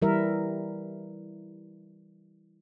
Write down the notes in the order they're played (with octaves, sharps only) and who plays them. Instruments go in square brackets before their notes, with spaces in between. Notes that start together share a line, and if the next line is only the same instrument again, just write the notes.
[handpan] E3 G3 E4 A#4 E5